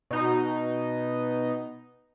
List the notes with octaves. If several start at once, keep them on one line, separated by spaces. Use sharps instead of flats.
B2 D#4